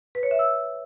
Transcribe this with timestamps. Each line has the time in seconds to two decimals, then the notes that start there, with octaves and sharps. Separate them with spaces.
0.15 B4
0.23 C#5
0.31 E5
0.39 E6